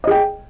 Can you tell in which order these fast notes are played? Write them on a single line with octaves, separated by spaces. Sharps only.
D#5 G#4 G5